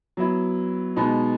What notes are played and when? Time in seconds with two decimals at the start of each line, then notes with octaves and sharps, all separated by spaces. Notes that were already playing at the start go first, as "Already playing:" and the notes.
0.17 F#3 B3 E4
0.96 B2 G#3 B3 D#4